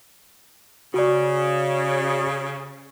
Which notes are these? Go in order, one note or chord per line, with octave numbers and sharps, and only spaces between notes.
C#3 F#4 D5